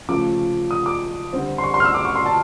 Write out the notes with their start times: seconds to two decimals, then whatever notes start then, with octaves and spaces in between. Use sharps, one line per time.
0.09 C#3 F3 A3 D6
0.71 D#6
0.86 D6
1.33 D3 G3 C4
1.58 C6
1.64 C#6
1.74 C6
1.80 F6
1.85 E6
1.95 D6
2.05 C#6
2.16 C6
2.26 A5